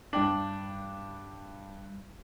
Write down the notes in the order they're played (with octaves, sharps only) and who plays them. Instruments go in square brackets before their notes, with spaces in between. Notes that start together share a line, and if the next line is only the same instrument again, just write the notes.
[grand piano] G2 G5 F#7 [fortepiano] D4